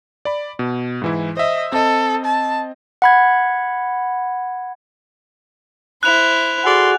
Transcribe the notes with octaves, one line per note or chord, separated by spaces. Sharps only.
D5 B5
B2
G#2 E3 E4
C5 D#5 E5
C4 A4 D#5
A5
F#5 B5 G#6
E4 C5 F#6 F7
F#4 G#4 A4 D5 C6